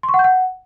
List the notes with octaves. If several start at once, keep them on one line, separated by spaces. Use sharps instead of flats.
C6
C#6
F#5
G6
F#5